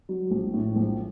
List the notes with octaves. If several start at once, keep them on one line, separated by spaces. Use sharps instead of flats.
F#3
A#1
A2
A#1